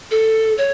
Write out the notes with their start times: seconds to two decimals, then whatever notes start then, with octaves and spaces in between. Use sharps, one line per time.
0.11 A4
0.58 C#5